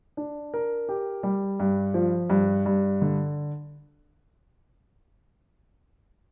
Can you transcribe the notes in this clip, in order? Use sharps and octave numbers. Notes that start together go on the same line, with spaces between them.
D4
A#4
G4
G3
G2
F3
G2
G2
D3